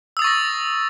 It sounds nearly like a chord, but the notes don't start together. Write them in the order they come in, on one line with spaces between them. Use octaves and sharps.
E6 D#6 A6 C#6 A#6